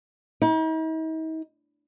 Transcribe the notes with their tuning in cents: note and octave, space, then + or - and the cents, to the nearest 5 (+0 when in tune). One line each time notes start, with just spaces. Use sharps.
D#4 +45